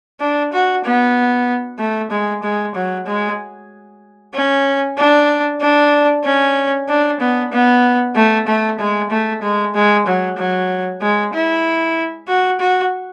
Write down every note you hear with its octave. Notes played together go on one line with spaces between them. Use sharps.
D4
F#4
B3
A3
G#3
G#3
F#3
G#3
C#4
D4
D4
C#4
D4
B3
B3
A3
A3
G#3
A3
G#3
G#3
F#3
F#3
G#3
E4
F#4
F#4